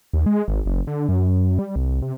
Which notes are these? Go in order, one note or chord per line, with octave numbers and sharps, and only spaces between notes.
D#2
G#3
G#1
F#1
D3
F#2
G3
C2
C3